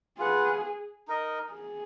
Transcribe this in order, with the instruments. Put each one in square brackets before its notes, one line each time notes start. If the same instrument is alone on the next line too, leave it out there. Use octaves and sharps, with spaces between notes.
[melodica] F4 B4 F#5 [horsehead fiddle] G#4
[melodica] D#4 A#4 D#5
[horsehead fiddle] G#4